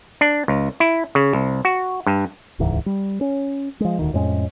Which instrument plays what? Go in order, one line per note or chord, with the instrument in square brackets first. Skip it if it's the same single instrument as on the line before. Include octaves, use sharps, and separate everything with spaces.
[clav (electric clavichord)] D4
C#2
E4
C#3
C2
F#4
G2
[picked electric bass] D#1 C#2 G#2 E3
G3
C#4
F3 G#3
D#1 D2 D#3
F2 A2 G#3 C#4